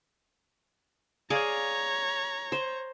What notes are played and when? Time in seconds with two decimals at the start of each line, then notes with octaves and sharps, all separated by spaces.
1.30 G#4 C#5 D5 F5 A#5
2.52 C5